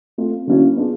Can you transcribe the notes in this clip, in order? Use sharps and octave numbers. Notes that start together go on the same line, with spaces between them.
A3 C4 F4
D3 F#3 A#3 C#4 E4
B3 D4 F4 G#4